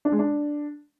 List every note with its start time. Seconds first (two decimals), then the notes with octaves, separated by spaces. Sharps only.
0.05 D4
0.12 G#3
0.19 D4